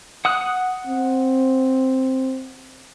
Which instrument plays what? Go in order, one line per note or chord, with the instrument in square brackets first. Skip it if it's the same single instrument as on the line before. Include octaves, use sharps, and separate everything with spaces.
[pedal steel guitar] F#5 D#6 F#6
[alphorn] C4